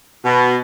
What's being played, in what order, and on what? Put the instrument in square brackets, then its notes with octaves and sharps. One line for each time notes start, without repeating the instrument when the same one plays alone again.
[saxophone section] B2